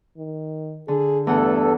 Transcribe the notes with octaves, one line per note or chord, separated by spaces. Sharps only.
D#3
D3 G#4
E2 G2 A3 A4 F#5